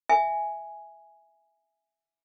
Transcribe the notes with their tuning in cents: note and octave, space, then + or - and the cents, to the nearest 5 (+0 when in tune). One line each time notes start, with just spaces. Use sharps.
E5 +0 G#5 +0